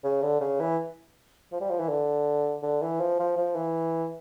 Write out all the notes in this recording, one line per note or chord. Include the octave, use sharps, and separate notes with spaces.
C#3
D3
C#3
E3
F3
G3
F3
E3
D3
D3
E3
F3
F3
F3
E3